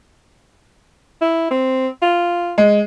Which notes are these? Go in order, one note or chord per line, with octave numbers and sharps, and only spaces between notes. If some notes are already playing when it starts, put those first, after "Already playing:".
E4
C4
F4
G#3